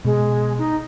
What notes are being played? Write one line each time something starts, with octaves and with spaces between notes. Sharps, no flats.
B2 G#3
D#4